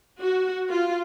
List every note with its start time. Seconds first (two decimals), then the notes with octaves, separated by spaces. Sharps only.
0.19 F#4
0.69 F4